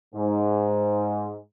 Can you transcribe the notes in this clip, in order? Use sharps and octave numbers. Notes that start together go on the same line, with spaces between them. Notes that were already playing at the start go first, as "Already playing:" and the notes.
G#2